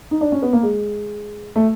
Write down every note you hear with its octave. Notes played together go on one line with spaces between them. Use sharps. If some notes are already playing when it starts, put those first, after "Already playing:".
D#4
D4
C#4
B3
A#3
G#3
A3